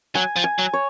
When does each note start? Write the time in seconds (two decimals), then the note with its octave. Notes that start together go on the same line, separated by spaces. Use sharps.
0.15 F#3 G#5
0.36 F3
0.44 G#5
0.59 F#3
0.73 C#5